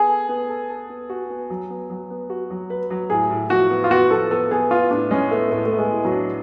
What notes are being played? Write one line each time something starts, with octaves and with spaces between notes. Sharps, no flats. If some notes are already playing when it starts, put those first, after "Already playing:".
Already playing: B3 G#4
A4
B3
A4
A4
B3
F#4
B3
F#3
B3
F#3
B3
F#4
F#3
B4
F#3
A2 G#4
A2
F3 F#4
B3
F4
B3 F#4
F3 A4
B3 A4
B3 G#4
B3 F4
A2 D4
G#3 C#4
A3 B3
A2 A3
A3
B3
G#3
A2
F#3
D4